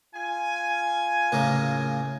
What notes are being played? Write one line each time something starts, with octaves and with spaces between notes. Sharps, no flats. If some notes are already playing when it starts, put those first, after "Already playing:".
F4 G#5
A2 C#3 A#3